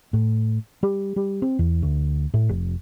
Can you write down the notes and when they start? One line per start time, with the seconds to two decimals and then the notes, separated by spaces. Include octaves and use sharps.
0.13 A2
0.83 G3
1.16 G3
1.42 C4
1.59 E2
1.82 D2
2.34 A2
2.49 F1